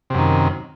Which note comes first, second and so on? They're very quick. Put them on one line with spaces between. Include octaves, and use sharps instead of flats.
C3 F#2 D#3